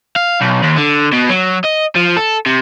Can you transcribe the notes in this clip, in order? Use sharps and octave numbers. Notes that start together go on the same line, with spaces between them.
F5
B1
D#2
D3
B2
F#3
D#5
F3
A4
C3